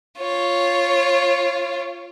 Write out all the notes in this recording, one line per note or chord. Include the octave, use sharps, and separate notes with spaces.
F4 C#5